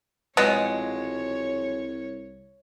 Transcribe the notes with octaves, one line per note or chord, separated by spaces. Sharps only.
C2 B2 F3 F#3 G#3 C#5